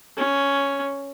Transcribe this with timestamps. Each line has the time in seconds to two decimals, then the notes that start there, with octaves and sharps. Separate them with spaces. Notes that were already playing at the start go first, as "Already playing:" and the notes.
0.18 C#4